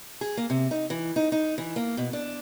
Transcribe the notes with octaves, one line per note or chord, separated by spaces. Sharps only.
G#4
A#3
C3
D#4
E3
D#4
D#4
E3
A#3
B2
D4